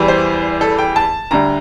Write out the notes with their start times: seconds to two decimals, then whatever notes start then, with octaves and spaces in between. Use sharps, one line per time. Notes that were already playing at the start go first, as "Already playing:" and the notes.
Already playing: E2 E3 G3
0.08 C5
0.61 A4
0.79 G5
0.96 A5
1.31 D2 D3 G3 A#5